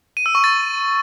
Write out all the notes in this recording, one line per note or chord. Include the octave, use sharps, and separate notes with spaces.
D#7
E6
C#6
A6